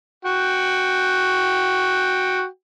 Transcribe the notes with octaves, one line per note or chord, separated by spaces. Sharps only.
F#4 G5